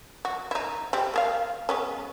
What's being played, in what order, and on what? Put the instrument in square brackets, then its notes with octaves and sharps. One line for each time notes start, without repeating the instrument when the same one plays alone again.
[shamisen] F#4
D#4 E4
G3 G#3 C4
A#3 G#4 F5
G#3 B3 C#4